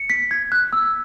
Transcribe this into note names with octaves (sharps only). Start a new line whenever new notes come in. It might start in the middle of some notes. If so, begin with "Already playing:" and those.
Already playing: C#7
B6
G#6
F#6
E6